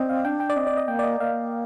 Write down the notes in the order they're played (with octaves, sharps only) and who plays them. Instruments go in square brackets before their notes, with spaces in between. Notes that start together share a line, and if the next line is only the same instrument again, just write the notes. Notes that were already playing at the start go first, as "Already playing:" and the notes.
Already playing: [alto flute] C4 [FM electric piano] D5 D#5
[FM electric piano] F5
[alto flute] D4 [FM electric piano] G5
[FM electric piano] G5
D5
[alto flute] C4 [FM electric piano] D#5
[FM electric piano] D5
D#5
[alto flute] A#3 [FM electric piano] G5
[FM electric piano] D5
D#5
[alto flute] A#3 [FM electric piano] F5